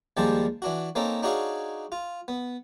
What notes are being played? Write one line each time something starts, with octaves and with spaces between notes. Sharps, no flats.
D#2 F3 G3 G#3 G4 A5
E3 D4 F#4
A#3 C4 C#4 D#4 A4
D4 D#4 F#4 G#4 C#5 F5
F4
B3